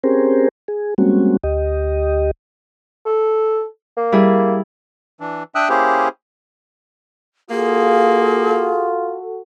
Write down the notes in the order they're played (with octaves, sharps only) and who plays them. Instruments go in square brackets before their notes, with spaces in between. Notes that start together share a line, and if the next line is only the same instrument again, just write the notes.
[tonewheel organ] C4 C#4 G4 G#4 A#4 C5
G#4
G3 G#3 A#3 C4 C#4 F#4
D2 G4 D#5
[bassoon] A4
A#3
[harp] G3 E4 G#4
[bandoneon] E3 D4
D4 E5 G5 D#6 E6 F#6
A#3 C#4 E4 G4 G#4 C5
[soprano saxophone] A#3 [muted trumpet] F4 [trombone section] F#4 A4 [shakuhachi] G#4